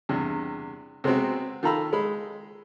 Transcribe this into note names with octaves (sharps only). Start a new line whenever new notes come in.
E2 G2 C3
C3 G#3 B3 C4 F#4
D#3 F4 A4 A#5 B5 E6
G#3 B5